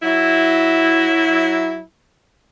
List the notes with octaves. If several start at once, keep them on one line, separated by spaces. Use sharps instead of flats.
F#3 E4